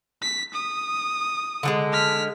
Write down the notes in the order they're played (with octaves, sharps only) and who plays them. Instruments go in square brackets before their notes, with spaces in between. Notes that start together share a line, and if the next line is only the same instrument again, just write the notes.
[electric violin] B6
D#6
[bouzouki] D3 F#3 G#3
[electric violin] F6 B6